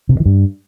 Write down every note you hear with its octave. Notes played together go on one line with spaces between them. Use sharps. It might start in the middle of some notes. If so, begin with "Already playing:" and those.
C3
G2
E3
G2